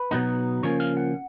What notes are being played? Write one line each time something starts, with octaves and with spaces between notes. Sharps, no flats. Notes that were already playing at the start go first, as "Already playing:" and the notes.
Already playing: B4
B2 F#3 B3 D#4
C#3 F3 A#3 C#4 C#5
F5
F#5